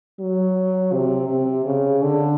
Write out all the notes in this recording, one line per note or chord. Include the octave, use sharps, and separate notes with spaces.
F#3
C3
C3
C#3
D3